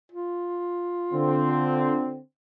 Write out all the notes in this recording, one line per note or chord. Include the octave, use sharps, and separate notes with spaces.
F4
D3 C4